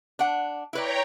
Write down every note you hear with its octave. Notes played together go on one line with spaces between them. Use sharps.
D4 F#5
E4 B4 C#5 D5 G5 A#5